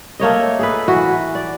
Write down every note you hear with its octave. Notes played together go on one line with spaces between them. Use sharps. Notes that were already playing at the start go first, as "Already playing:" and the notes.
A3 A#3 C#5 D#5
G#4 A4 B4
E3 F#4
D5